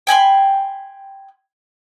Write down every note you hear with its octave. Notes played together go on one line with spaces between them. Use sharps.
G5 G#5 B5 C6